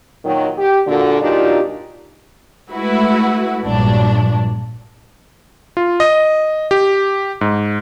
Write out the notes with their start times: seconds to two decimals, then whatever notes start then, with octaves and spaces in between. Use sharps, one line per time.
0.24 A#2 D#3 F#3
0.57 G4
0.87 A#2 D3 F#4
1.21 A#2 F#3 D4 D#4 F4 G4
2.70 G#3 A3 E4 F#4 B4
3.65 A#1 G2 F#3 D4
5.77 F4
6.00 D#5
6.71 G4
7.41 G#2